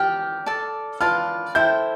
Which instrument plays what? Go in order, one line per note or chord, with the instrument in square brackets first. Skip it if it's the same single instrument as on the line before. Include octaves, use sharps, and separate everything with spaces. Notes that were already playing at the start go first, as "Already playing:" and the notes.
Already playing: [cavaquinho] G4 D5 G5 [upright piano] F6
[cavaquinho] A4 D5 A5
[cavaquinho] F4 B4 D5 A5 [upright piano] F6
[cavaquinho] E4 A4 C5 G5 [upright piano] G6